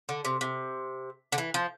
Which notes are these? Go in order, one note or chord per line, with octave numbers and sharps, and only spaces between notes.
D3
C3
C3
D3
E3
F3